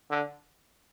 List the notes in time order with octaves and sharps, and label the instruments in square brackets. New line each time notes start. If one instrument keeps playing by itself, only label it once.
[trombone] D3